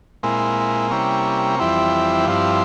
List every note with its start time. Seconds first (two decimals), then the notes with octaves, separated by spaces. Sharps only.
0.23 A#2 G#3 C4 E4
0.91 C3 G3 A#3 C#4 E4
1.59 F2 E3 G3 C4 E4
2.28 G2 F3 C4 E4